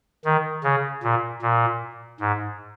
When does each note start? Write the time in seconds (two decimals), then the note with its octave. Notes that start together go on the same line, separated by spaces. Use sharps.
0.25 D#3
0.64 C#3
1.03 A#2
1.42 A#2
2.20 G#2